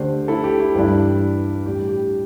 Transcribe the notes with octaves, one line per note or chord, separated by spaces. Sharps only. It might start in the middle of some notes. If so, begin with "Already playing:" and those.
Already playing: D3 A3 D4 G4 C5
E4 A4
G4
E4
G2 E3 G3 D4 E4
A2 G3 D4 G4
G4